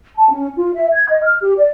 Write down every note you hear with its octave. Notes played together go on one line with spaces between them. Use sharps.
A5
C#4
F4
E5
G#6
D#5
F6
G4
D5